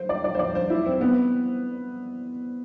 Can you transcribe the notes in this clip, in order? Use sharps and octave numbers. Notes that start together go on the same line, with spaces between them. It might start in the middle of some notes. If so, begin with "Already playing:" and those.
Already playing: C5
D5
D5
C5
D5
C5
E4
C4
B3